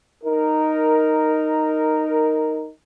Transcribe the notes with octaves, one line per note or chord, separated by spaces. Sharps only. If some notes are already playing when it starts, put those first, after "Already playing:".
D#4 A#4